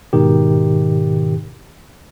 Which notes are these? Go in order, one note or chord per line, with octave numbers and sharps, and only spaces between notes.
G#2 B2 D#3 G4